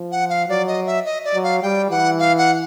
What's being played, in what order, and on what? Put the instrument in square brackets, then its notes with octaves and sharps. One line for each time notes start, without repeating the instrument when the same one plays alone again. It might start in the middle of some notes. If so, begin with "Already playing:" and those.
Already playing: [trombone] F3
[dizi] F#5
F5
[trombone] F#3 [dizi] D5
[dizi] D#5
E5
D#5
D5
[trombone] F#3
[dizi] F5
[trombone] G3 [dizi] G5
[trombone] E3 [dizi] F#5
[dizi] F5
F#5